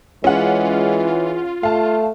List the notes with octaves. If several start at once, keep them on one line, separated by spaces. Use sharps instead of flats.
E3 G#3 C#4 F4 G#4 F#5
A3 F5 A5